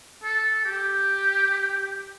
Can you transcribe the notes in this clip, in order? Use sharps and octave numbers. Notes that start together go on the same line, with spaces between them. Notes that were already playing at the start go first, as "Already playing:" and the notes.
A4
G4